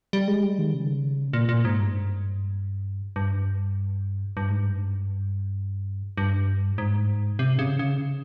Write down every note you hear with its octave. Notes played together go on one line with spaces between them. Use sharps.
G3
G#3
G3
D#3
C#3
A#2
A#2
G#2
G2
G2
G2
G#2
G2
G2
G#2
C3
C#3
C#3